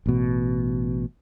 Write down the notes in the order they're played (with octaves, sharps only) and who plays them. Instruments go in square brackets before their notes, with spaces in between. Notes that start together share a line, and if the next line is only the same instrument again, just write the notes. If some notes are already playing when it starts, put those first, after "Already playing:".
[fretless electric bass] A1 B2